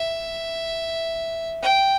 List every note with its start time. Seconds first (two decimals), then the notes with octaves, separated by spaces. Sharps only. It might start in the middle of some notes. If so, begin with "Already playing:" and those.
Already playing: E5
1.62 G5